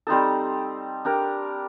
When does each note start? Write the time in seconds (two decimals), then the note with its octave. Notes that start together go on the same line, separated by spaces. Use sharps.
0.07 G3 C4 D#4 A4
1.05 D4 G4 A#4